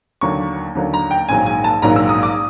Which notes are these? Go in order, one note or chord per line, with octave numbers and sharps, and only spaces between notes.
D#2 D3 F#3 A#3 C#6
D#2 D3 F#3 A#3
A#5
G5
A#1 G#2 D#3 F#3 A#3 G#5
G#5
A5
A#1 G#2 D#3 F#3 A#3 A#5
E6
D#6
D6